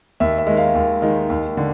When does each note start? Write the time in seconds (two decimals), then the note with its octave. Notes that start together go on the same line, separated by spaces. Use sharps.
0.20 D#2 E5
0.38 E5
0.47 D#3 G#3
0.57 F5
0.75 D#2
1.02 D#3 G#3
1.30 D#2
1.57 D3